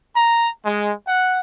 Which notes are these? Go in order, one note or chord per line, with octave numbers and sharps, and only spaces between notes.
A#5
G#3
F#5